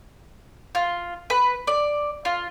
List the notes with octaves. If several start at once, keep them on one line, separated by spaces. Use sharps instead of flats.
F4
B4
D5
F4